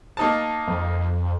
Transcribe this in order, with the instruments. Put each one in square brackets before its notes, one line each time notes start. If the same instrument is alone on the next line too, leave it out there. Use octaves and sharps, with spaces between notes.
[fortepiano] A#3 D#4 A5
[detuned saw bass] F2